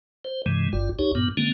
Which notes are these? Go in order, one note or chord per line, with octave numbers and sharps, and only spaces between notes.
C5
G2 C3 E3 G#3
G1 G2 F4
C#2 D#4 G4 C#5
G2 A#2 B3
D3 G#3 A#3 C4 C#4